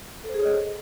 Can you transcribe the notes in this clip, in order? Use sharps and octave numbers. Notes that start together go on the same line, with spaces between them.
A4
C5
G#4
C#5
D#5